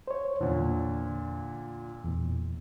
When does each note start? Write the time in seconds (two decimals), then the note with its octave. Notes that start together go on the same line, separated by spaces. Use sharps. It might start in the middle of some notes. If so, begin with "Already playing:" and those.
0.08 C5 C#5
0.41 E2 A#2 D3
2.04 E2 A#2